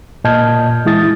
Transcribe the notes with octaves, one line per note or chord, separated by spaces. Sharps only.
A#2 D#5 A5 F6 G6 G#6
E3 G#3 E4 D#6 A6